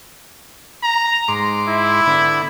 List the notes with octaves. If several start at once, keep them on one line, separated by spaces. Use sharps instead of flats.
A#5
G#2 C6 D6
E4
D3 B3